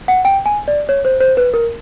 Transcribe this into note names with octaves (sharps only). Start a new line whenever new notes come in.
F#5
G5
G#5
D5
C#5
C5
C5
B4
A#4